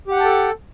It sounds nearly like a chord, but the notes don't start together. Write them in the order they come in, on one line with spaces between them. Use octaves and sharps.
G4 F#5 G5 A5 A4